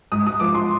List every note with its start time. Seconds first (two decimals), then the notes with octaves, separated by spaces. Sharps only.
0.12 G#2 D#6
0.26 D#6
0.40 F3 D6
0.54 C6